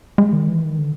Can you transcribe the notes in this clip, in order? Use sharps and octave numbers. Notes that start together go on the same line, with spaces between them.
G#3
D#3
E3
D#3
D3